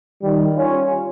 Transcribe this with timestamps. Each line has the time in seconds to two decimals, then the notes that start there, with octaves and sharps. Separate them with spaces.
0.22 D#3 G3
0.55 C#4 F4